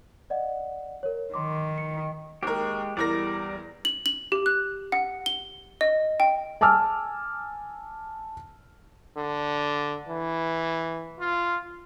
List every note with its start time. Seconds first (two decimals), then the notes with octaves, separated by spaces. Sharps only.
0.30 D5 D#5 F#5
1.03 A#4 C#5
1.34 D#3 C6 D6
1.78 C#7
2.43 D#2 G#3 G4 A#4
2.97 E2 G3 A#4 D5 A#6
3.85 F#7
4.06 F#7
4.32 G4
4.46 F#6
4.92 F#5
5.26 G7
5.81 D#5
6.20 G5
6.61 G#5 A5 D6 E6 F6
9.17 D3
10.09 E3
11.20 F4